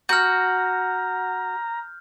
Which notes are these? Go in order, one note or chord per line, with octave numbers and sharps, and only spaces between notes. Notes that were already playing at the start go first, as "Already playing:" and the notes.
F#4 A#5 F6 G6